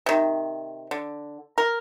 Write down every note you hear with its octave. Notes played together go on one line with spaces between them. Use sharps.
C3 D#3
D3
A#4